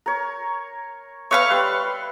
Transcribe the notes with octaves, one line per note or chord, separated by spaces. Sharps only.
A#4 C#5
B4 C#5 E5 F5 C#6
G3 B4 C6